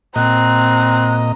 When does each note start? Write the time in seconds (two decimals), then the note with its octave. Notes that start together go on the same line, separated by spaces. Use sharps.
0.16 A#2 C4 D#5 A#5 F#6